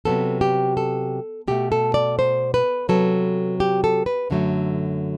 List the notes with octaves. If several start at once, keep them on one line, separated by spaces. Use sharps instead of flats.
C3 F#3 B3 A4
G4
A4
B2 A3 G4
A4
D5
C5
B4
C3 F#3 B3 A4
G4
A4
B4
F#2 D3 F#3 A3